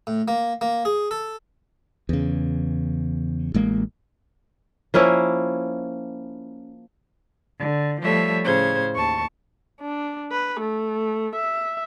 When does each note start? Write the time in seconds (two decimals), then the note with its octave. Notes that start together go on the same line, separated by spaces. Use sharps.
0.07 A2
0.28 A#3
0.61 A#3
0.85 G#4
1.11 A4
2.09 E2 C#3
3.54 A1 G#3 A#3
4.94 F3 A#3 C#4 E4
7.57 D3
8.00 F3 G3 A3 C#5 E5
8.44 A2 C#3 C5 G#6
8.95 D#2 A5 C#6
9.80 D4
10.32 B4
10.60 A3
11.36 E5